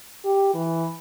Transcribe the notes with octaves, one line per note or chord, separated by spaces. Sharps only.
G4
E3